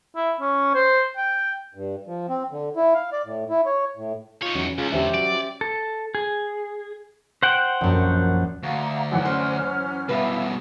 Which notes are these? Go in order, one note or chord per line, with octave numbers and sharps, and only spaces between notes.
E4
C#4
C5
G5
G2
F3
C4
D3
E4
F5
D5
A2
E4
C#5
A2
D#4 F4 C#5
E2 F#3 C#4
C#2 F4 G#4
E2 D3 G4 C5 E5
F#3 D5
A4
G#4
C5 F#5 G5
A#1 F#2
D2 F5 F#5 A#5
F#2 E3 F#5
C#4 C5 F6
B2 G3 E4 B4 F5